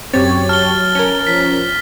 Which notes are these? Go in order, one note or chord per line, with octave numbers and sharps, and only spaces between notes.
F#2 F#3 C4 G4 C#5 A6
A5 F6 G7
C#4 A#4
F3 B6